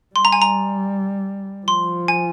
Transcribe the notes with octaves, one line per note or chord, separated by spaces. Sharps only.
G3 C6
A#5
G#5
A#5
F3 C6
G#5